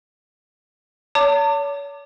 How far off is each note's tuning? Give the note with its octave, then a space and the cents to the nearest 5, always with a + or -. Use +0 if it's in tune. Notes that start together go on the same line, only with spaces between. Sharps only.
C#5 +35 A5 +40 D6 +10